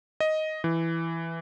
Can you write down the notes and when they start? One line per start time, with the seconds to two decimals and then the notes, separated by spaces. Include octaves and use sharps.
0.20 D#5
0.64 E3